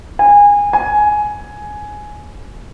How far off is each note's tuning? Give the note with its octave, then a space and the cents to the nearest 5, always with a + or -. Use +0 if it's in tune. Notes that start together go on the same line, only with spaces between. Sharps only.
G#5 -25
G#5 +10